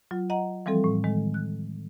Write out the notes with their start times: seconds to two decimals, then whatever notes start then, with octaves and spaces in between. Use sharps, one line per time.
0.11 F#3 F4
0.30 D#5 F#5 A#5
0.66 E3 F3 G3 C4 A4
0.84 A2
1.04 D#3 G#3
1.34 F#6